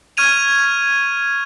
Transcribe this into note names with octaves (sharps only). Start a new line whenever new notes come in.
C#6 F6 G#6 D#7 F7